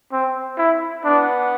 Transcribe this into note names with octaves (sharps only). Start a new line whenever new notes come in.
C4
E4
B3 D4